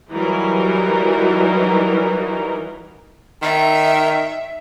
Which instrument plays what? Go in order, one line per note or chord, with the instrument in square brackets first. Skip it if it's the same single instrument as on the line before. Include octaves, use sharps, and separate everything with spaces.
[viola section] E3 F#3 G3 D#4 F#4 A#4
[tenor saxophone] D#3 [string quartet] E5